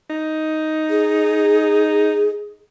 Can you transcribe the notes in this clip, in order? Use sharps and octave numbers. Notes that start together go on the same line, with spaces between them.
D#4
G#4